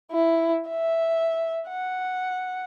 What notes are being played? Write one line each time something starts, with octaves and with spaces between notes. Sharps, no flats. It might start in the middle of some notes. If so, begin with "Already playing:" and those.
E4
E5
F#5